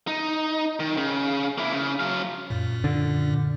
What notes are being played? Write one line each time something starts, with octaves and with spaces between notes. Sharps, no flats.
D#4
D#3
C#3
A#3 E4
C#3
F#3 F5
F#2 A#2
D3